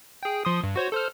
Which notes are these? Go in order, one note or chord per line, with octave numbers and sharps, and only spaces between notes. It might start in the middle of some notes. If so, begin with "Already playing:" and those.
G#4 G5
F3 C6 D#6
G2
F#4 C5 C#5
A4 C5 F6